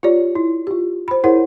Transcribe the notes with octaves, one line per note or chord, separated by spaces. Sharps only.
F4 G4 C#5 D5
E4
F4 G4
C5 B5
E4 G#4 A#4 C5 C#5 F#5